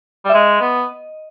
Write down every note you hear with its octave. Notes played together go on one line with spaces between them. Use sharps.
G3 E5
G#3 D#5
B3